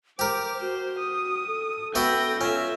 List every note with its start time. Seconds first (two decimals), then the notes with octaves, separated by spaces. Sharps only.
0.19 G4 A#4 C5 D6
0.61 F#4 C5
0.99 D#6
1.47 A4
1.95 B3 F#4 E5 G5 A#6
2.41 C#4 F4 E5